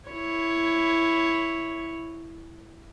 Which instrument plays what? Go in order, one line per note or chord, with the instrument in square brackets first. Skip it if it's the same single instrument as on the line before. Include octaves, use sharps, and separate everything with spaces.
[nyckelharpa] E4 C#5